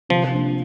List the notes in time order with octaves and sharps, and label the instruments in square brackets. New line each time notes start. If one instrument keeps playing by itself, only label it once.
[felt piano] C3 [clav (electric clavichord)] F3
[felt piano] F3 A#3 D4 F4